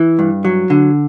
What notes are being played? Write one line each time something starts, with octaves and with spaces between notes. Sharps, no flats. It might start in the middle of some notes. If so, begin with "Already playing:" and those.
Already playing: E3 E4
G2
F#3
D3